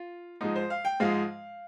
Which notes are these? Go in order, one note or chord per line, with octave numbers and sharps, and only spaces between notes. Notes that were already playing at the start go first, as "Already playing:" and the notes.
Already playing: F4
G#2 F3 G#3 D#4
C5
F5
G5
G#2 F3 G#3 F5